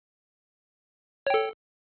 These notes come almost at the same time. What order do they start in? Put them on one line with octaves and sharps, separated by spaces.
C#5 G5 A4